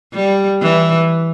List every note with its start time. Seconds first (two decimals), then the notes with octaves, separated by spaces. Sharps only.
0.14 G3
0.62 E3